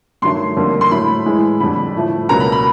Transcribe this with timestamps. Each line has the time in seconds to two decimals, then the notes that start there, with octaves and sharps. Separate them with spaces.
0.22 G2 D#3 F#3 A3 C6
0.57 F2 D3 G3 A#3
0.81 C6
0.91 A2 F#3 A3 B5
1.26 A2 E3 G#3
1.60 F2 D3 G3 B5
1.95 A2 F3 A3
2.29 C#2 B2 F#3 A#3 A#5
2.40 B5
2.52 B5